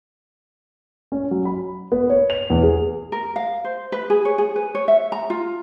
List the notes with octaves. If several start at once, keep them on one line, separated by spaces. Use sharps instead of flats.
C#4
F#3
B5
B3
C#5
F7
E2
G#4
A#4
F5
C5
B4
G#4
C#5
G#4
B4
C#5
E5
A#5
F4